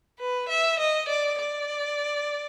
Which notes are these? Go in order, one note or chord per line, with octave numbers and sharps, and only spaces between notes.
B4
E5
D#5
D5
D5